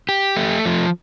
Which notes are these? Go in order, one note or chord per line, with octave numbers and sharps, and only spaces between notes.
G4
A3
F3